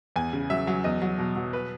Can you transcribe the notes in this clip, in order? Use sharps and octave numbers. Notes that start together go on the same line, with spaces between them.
E2 G#5
C#3
F#3 E5
F#3
E2 D#5
F#3
B2
F#3
B4